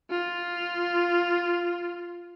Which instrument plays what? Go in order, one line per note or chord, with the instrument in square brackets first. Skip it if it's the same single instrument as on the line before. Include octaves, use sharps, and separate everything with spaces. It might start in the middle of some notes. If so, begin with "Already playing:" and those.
[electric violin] F4